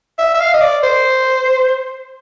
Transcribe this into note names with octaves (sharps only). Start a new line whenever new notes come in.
E5
E5
F5
D#5
D5
C5